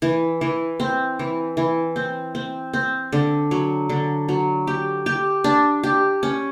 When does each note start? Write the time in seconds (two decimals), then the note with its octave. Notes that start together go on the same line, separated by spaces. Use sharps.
0.02 E3
0.41 E3
0.80 C4
1.19 E3
1.57 E3
1.96 C4
2.35 C4
2.73 C4
3.12 D3
3.51 F#3
3.89 D3
4.29 F#3
4.67 G4
5.06 G4
5.44 D4
5.83 G4
6.23 C#4